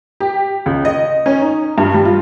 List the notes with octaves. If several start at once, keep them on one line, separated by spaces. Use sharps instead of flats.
G4
C#2
D#5
C#4
D#4
G2
G3
F4